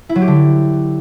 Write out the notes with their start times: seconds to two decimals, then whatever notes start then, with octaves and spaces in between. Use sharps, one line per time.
0.09 E4
0.15 F#3
0.21 G4
0.28 D3